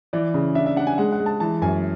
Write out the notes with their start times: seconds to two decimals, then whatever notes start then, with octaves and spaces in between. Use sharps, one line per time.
0.13 E3 D5
0.34 C#3
0.55 D4 E5
0.66 E5
0.77 D4 F#5
0.87 G#5
0.98 G#3 F#5
1.12 F#5
1.20 G#3
1.26 A5
1.40 E3 A5
1.62 F#2 G#5